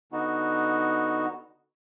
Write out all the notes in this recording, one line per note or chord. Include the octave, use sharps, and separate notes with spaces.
D3 B3 D#4 F#4